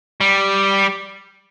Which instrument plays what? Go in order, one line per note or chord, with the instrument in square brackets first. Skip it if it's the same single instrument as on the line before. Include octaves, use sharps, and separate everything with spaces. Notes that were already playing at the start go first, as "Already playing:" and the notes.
[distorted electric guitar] G3